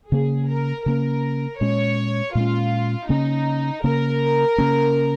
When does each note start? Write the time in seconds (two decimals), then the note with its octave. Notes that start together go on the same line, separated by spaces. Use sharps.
0.11 C#3 A#3 C#4 G#4
0.49 A#4
0.86 C#3 A#3 C#4 A#4
1.60 A#2 G#3 C#4 C#5
2.35 A#2 G#3 C#4 F4
3.09 C#3 A#3 C#4 D#4
3.84 C#3 A#3 C#4 A#4
4.58 C#3 A#3 C#4